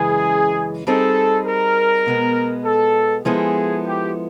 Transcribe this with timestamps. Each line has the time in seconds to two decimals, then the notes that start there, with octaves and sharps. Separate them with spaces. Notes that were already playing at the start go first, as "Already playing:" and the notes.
Already playing: F#2 C#3 E3 G#3 G#4
0.87 G3 C4 D#4 G#4 A4
1.46 A#4
2.06 B2 G#3 B3
2.65 A4
3.25 F3 G#3 B3 E4 G#4 A4
3.85 G4